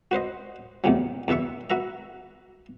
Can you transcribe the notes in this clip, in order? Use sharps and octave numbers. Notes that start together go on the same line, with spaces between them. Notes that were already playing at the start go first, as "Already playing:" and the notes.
F#4 B4 C5 D#5
E2 A2 C3 F#3
E2 B2 B4 E5 C#6
F#4 B4 E5 A#5